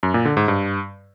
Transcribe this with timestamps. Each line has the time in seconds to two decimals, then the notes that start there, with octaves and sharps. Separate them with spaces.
0.03 F#2
0.14 A#2
0.25 D3
0.37 G#2
0.48 G2